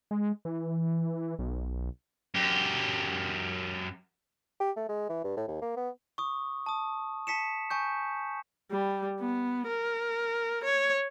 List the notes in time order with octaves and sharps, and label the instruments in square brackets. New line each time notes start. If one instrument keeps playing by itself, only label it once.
[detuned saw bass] G#3
E3
B1
[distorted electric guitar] F#2 G4
[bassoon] G4
A3
G#3
E3
G2
A2
D#2
A#3
B3
[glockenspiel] C#6 D#6
A5 D#6
A5 B6 C#7 E7
G#5 C#6 G6
[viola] G3
B3
A#4
C#5